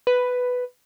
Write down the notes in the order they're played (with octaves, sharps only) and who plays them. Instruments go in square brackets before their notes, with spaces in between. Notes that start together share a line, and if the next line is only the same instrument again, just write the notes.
[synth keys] B4